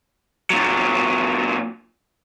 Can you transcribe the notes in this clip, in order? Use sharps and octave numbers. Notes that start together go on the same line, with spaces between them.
A#2 F#3